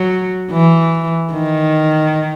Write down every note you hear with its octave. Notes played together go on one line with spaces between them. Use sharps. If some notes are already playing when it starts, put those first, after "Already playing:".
Already playing: F#3
E3
D#3